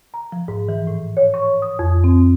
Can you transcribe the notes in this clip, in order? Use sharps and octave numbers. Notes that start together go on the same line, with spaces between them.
A#5
F3
G#2
E3
A2
C#5
C#6
D#6
F2
C4